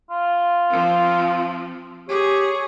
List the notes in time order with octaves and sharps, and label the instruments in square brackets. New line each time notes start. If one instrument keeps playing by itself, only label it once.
[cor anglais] F4
[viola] F3 C4
[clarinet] G4 [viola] G#4 [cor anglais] C#5